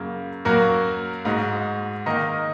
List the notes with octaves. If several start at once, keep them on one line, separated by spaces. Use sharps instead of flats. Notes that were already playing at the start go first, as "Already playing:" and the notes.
Already playing: F#2 C#3 A#3
F#2 F#3 A#3 F#4 A#4
G#2 G#3 F#4
D#3 A#3 D#4 A#4 D#5